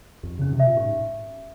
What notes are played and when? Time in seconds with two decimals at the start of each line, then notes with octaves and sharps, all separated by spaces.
0.23 F2 G4
0.39 C#3 C#4
0.53 C3
0.60 E5
0.67 A#2
0.77 G#2 G4